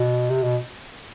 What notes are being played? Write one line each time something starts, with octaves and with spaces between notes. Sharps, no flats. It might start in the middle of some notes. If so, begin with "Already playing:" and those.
Already playing: B2
C3
B2